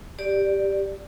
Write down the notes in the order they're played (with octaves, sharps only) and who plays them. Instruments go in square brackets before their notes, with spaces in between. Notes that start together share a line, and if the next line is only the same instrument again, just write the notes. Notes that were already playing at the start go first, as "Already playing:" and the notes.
[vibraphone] G4 D5